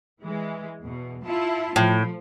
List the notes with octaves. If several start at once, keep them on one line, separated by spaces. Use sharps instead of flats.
E3 G#3
E2 B2
E4 F4 A5
A2 F3